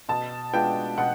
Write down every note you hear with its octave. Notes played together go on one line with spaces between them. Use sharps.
B2 A5
G#3 B3 D4 F4 G5
B2 F#5